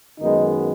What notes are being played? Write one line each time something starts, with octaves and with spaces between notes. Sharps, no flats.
F#2 D#3 G#3 B3 D#4